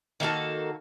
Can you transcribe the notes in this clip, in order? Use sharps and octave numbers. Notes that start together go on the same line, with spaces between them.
D#3 A#3 F#4 A4